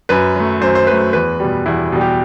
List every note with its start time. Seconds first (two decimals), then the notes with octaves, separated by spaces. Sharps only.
0.09 F#2 B4
0.35 F#3 A3
0.61 F#2 C5
0.75 C5
0.87 F#3 A3 B4
1.13 E2 B4
1.40 B2 G3
1.66 E2 E4
1.92 B2 G3
2.01 G4